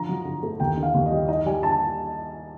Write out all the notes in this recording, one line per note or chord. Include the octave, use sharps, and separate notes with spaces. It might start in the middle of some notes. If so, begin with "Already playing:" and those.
Already playing: D3 F3 A#5
F#3
D3
A3
D#2 G5
D3
F5
D#2
D#5
G3
D#4 D#5
G3 G#5
D3 A5